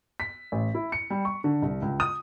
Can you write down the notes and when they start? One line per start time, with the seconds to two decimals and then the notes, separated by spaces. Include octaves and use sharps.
0.20 B6
0.52 A1
0.75 E4
0.92 C#7
1.10 G3
1.25 C#6
1.44 D3
1.62 C2
1.82 C#2
2.00 D#6